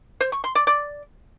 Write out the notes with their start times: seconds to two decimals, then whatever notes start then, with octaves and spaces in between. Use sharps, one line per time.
0.21 C5
0.32 C#6
0.44 C6
0.55 D5
0.67 D5